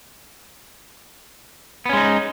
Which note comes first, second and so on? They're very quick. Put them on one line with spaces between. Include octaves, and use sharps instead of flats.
B3 C#4 G#3 D#4